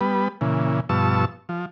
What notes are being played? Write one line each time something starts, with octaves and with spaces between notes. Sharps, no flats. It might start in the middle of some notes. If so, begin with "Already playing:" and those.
G3 B3 B4
A#2 C#3 E3
G2 B2 F3 A5 C#6 E6
F3